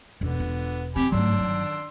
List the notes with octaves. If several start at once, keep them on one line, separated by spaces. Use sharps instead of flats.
E1 F#2 B2 D3 B3
F4
F3 C4 G4 G#5 B5
G1 C#2 G#2 F#3 A3 D4 C6 E6
D#3